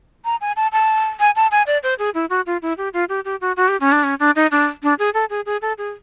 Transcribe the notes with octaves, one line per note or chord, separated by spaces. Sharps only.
A#5
G#5
A5
A5
G#5
A5
G#5
D5
C5
G#4
E4
F#4
F4
E4
G4
F4
G4
G4
F#4
F#4
G4
C#4
D4
C#4
D4
D#4
D4
D4
G#4
A4
G#4
G#4
A4
G#4